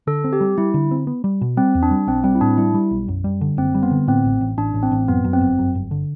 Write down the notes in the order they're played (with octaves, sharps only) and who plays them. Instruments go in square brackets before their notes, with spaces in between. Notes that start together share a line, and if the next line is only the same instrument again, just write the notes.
[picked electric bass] D3 [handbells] A4
[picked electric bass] C4
[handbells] G4
[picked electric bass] G3
[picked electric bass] G3 [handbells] E4
[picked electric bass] D3
C4
B3
G3
B2
[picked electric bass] G3 [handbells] C4
[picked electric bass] E2
[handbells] D4
[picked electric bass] G3
[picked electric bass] B1 [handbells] C4
[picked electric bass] G3 [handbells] C4
[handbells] E4
[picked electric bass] A2 [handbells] D4
[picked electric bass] G3 [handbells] E4
[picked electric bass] G3
B1
F#2
G3
D3
[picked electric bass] F#1 [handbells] C4
[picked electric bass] G3
[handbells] B3
[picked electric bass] D3
[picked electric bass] A2 [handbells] C4
[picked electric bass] A1
A1
[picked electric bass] A1 [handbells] D4
[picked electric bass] A1
[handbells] C4
[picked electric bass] A1
[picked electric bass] F#2 [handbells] B3
[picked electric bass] F#2
[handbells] C4
[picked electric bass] G1
F#2
G1
D3